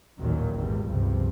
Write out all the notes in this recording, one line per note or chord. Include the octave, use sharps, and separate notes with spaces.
A1 D#2 A#2 D#3 F#3
G#1 E2 G3
G1 C#2 G2 C3 F3